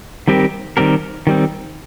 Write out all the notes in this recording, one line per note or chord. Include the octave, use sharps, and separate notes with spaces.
D#3 G3 C4 G4 A#4
D#3 G3 C4 G4 A#4
D#3 G3 C4